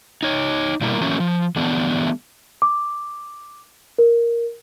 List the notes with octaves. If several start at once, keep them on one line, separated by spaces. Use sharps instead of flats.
D#4 C#5
B2 G3 A#3 E4 A#4
E3 F#3 A3 A#3 C#4
F3
D3 E3 G3 A3 B3 D4
D6
A#4